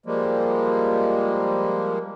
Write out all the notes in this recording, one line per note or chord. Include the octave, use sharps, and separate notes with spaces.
F3 G3 G#3 A#3